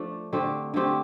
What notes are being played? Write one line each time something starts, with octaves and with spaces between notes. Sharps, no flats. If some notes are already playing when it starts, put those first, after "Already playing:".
Already playing: F3 A3 D4
D3 A3 C4 G4
D3 A3 C4 G4